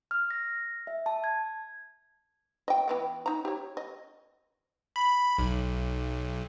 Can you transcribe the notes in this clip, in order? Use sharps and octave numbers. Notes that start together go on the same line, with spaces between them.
F6
A#6
E5
A5
G#6
D#5 G5
E3 B3 G5
D#4 A#5
G4 C#5
D#5
B5
B1